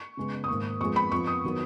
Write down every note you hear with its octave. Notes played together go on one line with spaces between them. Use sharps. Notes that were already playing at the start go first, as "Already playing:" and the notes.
Already playing: C#6
C#3 G#3 B3
D#6
G#2 D#3 A#3 C#6
F2 F3 G#3 B3 C#6
B5
F2 F3 B3 C#6
D#6
D#3 F#3 B3